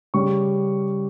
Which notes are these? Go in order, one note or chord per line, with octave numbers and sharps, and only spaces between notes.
C#3 G3 C#4 C#6